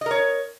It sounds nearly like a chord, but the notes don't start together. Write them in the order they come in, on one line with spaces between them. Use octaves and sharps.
D#5 A#4 C#5